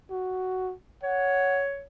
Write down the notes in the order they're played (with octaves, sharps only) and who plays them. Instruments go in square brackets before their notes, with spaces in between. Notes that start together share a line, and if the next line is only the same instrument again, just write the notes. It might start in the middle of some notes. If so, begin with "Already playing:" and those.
[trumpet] F#4
[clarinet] C#5 [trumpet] F#5